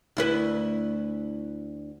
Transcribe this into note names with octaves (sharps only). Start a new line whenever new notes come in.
D2 E4 B4